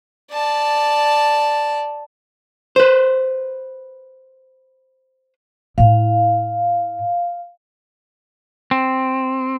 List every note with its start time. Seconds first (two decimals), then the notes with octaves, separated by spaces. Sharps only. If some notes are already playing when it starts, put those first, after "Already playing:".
0.31 D5 A5
2.76 B4 C5
5.78 A2 E4 F5
8.71 C4